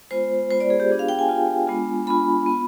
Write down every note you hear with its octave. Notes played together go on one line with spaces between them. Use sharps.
G#3 B3 F4 C5
G#3 B3 F4 C5
D5
G#4
G4
B3 D4 F4 G#4
F5
G5
G#5
B3 D4 F4
G#3 B3 D4 F4
G#3 B3 D4 F4 B5
B3 F4